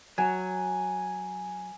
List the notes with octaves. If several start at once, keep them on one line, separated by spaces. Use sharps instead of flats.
F#3 G#5